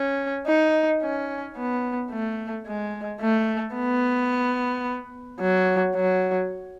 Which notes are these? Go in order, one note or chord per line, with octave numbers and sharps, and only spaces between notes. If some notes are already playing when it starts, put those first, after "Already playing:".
Already playing: C#4
D#4
C#4
B3
A3
G#3
A3
B3
F#3
F#3